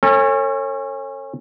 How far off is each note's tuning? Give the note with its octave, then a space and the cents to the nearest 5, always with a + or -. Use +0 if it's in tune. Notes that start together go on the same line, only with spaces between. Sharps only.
C#4 -25 A4 +40